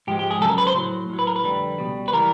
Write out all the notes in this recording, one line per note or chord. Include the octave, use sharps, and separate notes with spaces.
G#2 F3 G#3 G4
G4
G#4
F#2 C#3 F#3 A4
A#4
B4
C5
A2 F#3
A2 F#3
B4
A#4
B4
F2 D3 G3
C#2 B2 G3
B4
E3 G3 A#4